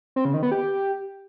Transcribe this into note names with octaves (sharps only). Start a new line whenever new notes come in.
C4
C#3
D#3
B3
G4